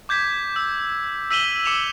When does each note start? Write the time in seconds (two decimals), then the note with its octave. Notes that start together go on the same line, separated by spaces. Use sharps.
0.09 D6 G6 G#6 B6
0.56 E6
1.31 E6 B6 D#7 E7 F#7 G7
1.65 D6 C#7 E7 F7